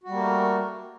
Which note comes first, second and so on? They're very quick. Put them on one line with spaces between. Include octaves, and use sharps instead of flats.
F#4 G3 A#3 A3 A#4